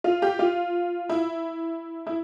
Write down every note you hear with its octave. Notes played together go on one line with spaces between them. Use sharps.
F4
G4
F4
E4
E4